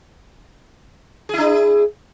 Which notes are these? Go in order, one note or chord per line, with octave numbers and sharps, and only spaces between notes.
D4 E4 G#4